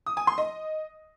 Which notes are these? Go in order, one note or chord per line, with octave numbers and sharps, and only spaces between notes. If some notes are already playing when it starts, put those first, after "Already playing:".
D#6
G#5
C6
D#5